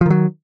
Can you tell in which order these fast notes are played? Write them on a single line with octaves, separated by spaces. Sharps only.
F3 D#3 F#3